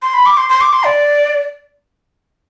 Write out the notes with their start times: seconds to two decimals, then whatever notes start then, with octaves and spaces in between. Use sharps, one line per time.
0.02 C6
0.14 B5
0.26 D6
0.37 C6
0.49 C6
0.61 D6
0.73 C6
0.85 D5